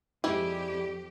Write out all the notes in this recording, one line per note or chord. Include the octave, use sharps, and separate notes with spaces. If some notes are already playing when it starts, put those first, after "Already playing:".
F2 G3 G#3 E4 G4